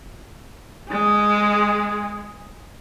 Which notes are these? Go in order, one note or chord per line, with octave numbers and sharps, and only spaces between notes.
G#3 G#4